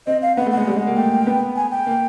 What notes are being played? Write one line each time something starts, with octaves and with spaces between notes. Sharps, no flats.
C4 D#5
F5
B3 F#5
A3
F#5
G#3
G3
G#3
A#3
A3 G5
B3
G#5
G5
A#3